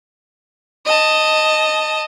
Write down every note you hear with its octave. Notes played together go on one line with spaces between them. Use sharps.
D#5 A5